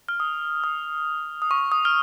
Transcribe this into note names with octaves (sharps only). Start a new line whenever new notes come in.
F6
D#6
D#6
D#6
C#6
D#6
F6